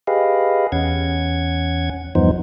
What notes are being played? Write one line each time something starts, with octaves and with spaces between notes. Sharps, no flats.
G4 G#4 B4 D#5 F5
E2 C#4 F#5 G#6
E2 G2 F3 B3 D#4 C5